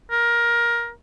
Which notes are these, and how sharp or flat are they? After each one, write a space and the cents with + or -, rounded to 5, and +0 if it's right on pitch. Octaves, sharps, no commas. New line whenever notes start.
A#4 +20